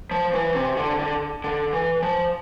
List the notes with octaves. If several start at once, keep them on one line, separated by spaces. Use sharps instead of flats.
F3
E3
C3
D3
D3
D3
E3
F3